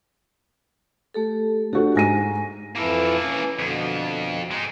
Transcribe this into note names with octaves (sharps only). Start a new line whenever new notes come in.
A3 G4 A4
D4 F#4 G4 A4
G#2 G#5 A#6 D#7
F2 E3 A#3 E4 A4
E3 C#4
F2 B2 D3
G#3 D#4